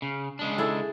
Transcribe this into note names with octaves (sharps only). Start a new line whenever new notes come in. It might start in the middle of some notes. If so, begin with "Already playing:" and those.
C#3
C#3 G#3 D4
E4 G#4 A4